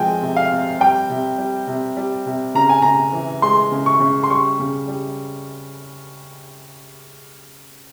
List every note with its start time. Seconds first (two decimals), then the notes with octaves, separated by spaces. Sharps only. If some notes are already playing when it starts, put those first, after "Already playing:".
Already playing: C3 F3 G#3 G5 G#5
0.22 C3
0.36 F5
0.52 C3
0.80 G3 G5
1.10 C3
1.38 G3
1.67 C3
1.97 G3
2.26 C3
2.55 C#3 A#5
2.69 G#5
2.82 C#3 A#5
3.13 E3
3.42 G#3 C6
3.72 C#3
3.86 C#6
4.00 C#3
4.24 C6
4.30 G3 C#6
4.59 C#3
4.88 G3